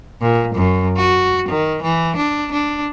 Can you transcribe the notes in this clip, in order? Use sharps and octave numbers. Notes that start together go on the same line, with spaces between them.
A#2
F#2
F#4
D#3
E3
D4
D4